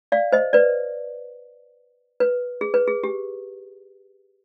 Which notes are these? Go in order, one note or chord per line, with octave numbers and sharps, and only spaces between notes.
D5 F5
C5 D#5
B4 D5
B4
G#4
B4
G#4
G4